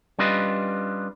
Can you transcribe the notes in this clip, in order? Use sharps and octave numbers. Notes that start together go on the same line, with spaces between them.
G3 C#4 D4 F4 B4 D#5